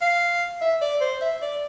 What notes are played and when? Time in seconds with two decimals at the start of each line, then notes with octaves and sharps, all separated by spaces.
0.02 F5
0.61 E5
0.81 D5
1.01 C5
1.21 E5
1.42 D5